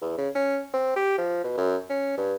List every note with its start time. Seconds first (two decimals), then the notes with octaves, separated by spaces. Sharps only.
0.01 E2
0.18 C#3
0.35 C#4
0.74 C4
0.96 G4
1.18 F3
1.44 B2
1.58 F#2
1.89 C#4
2.18 G2